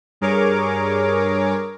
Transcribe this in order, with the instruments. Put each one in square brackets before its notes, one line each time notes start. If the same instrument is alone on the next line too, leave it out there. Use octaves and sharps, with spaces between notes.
[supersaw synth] G2 G#4 A#4 C#5 D6